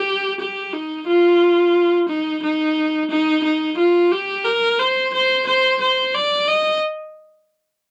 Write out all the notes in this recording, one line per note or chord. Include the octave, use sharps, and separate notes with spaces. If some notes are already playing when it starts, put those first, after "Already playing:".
Already playing: G4
G4
D#4
F4
D#4
D#4
D#4
D#4
F4
G4
A#4
C5
C5
C5
C5
D5
D#5